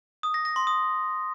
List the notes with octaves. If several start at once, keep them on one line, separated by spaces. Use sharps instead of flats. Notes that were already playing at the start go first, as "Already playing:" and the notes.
D#6
A#6
A#6
C6
D#6